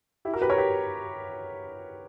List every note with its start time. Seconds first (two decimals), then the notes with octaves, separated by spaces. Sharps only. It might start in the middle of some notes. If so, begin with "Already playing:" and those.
0.25 E4 G4
0.33 F#4 A#4
0.42 G4 B4
0.50 A#4 C#5
0.58 G4 B4